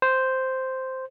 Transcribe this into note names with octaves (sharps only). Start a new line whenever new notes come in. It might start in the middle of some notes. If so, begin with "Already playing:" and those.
C5